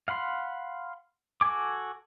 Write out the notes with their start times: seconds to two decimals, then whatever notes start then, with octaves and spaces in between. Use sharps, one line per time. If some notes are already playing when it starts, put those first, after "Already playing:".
0.08 F5 F#5 B5 C6
1.41 F#4 A4 G#5 D6